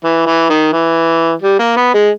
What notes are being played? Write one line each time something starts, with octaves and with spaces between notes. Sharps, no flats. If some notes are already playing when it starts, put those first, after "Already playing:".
E3
E3
D#3
E3
G3
A#3
B3
G#3